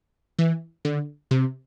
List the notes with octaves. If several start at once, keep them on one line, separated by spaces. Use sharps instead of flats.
E3
D3
C3